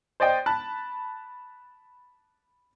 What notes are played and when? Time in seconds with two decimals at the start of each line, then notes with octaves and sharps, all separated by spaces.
0.20 C5 D5 D#5 G5
0.46 A5 B5 F#6